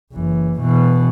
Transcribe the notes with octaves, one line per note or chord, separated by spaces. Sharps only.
F#1 E3
B2 E3